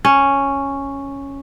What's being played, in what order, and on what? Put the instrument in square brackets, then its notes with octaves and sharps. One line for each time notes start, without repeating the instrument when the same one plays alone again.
[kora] C#4